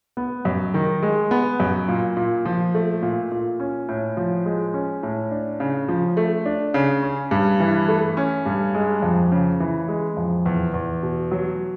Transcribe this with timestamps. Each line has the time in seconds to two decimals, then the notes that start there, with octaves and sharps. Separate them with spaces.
0.17 B3
0.45 F#2
0.74 D#3
1.02 G#3
1.31 B3
1.60 F#2
1.88 A#2
2.17 A#2
2.45 F3
2.75 A3
3.02 A#2
3.32 A#2
3.60 C#4
3.89 A2
4.17 F3
4.46 G#3
4.74 C#4
5.03 A2
5.31 D4
5.60 C#3
5.88 F3
6.17 A3
6.46 D4
6.74 C#3
7.03 C#4
7.31 G2
7.60 E3
7.88 A3
8.17 C#4
8.46 G2
8.74 G#3
9.02 F2
9.32 C#3
9.60 E3
9.88 G#3
10.17 F2
10.46 E2
10.74 E2
11.03 B2
11.31 F#3